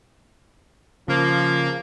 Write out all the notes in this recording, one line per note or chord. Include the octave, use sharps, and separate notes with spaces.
C#3 F3 A#3